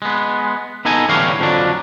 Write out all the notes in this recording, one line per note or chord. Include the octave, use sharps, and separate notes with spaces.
G#3 B3
B3 D#4 A4 D#5 G#5
A2 D3 E3 G3 C#5 F5
F2 D3 F3 F#3 D4